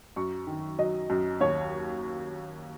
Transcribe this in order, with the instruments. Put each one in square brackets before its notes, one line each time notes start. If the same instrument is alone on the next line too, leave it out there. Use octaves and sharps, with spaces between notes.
[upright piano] F#2 C#6
D#3
F#3 D#5
F#2
D#2 C#5